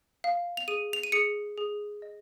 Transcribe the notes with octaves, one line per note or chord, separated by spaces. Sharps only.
F5
F7
G#4 D#7
F7
D#7
G#4 C#7
G#4
D#5